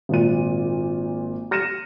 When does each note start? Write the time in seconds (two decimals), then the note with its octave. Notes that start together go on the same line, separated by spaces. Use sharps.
0.09 G#1 A#2 D#7
1.51 F6 A#6 C#7 D#7 E7